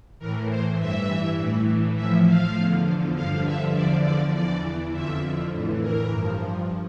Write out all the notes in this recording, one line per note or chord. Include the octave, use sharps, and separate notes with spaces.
A2 E3 A#4
C5
G2 E3 E5
A2 E3
A2 F3 E5
F5
E2 D3 F3
G2 D3 F3 F5
E5
E2 D3 F3 D5
D5
E2 E3 D5
F2 D3 F3 E5
A2 E3
A#4
G2 F3